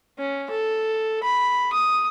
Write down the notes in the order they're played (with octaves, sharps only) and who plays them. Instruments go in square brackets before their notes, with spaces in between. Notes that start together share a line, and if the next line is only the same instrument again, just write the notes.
[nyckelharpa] C#4
A4
B5
D#6